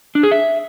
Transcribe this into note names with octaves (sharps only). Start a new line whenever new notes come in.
D4
G#4
E5